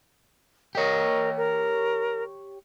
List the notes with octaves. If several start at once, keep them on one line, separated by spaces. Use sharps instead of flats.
G4 A#4 C#5 D#5
A#4